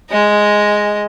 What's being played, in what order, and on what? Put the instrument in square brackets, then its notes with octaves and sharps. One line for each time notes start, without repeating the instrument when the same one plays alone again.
[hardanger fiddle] G#3 D#5